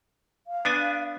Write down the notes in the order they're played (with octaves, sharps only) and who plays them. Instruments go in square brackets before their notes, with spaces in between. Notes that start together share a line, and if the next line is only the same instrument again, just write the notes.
[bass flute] F5
[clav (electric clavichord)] B3 D4 G#5